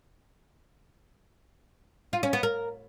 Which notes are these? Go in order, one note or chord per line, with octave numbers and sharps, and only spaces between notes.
F4
C#4
B3
A#4